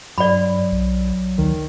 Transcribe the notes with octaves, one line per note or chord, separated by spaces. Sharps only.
G2 F#3 D5 B5
B1
D2 D#3